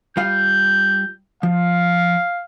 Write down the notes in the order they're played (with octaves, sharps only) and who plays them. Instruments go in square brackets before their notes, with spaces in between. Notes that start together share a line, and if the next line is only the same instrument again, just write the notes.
[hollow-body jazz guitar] G3 F4 F5 [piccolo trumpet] G6
[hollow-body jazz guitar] F3 [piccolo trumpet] F5